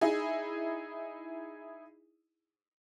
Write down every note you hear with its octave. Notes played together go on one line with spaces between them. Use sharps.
D#4 E4 G#4